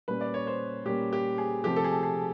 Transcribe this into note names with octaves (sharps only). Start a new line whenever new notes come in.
A#2 G3 A#3 C#4 B4
D5
C#5
C5
A#2 G3 A#3 C#4 G4
G4
G#4
C3 F3 A3 G4
A4
G#4
G#4